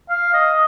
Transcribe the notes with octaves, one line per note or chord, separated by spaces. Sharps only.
F5
D#5